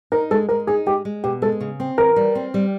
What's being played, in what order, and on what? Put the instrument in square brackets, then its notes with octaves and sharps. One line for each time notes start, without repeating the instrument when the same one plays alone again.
[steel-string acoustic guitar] D#4 [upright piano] A#4
[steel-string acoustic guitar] G#3 [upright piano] A4
[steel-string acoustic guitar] G#3 [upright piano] A#4
[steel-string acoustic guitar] D#4 [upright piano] G#4
[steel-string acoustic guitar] G#3 [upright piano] G4
[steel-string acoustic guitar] G#3
[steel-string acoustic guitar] B2 [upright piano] G4
[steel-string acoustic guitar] G#3 [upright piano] A4
[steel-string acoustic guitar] C#3
C4
[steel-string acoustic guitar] E3 [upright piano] A#4
[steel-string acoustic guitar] G3
C4
G3